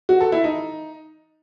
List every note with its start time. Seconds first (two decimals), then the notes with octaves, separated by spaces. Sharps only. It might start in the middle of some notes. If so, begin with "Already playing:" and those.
0.09 F#4
0.21 A4
0.32 E4
0.44 D#4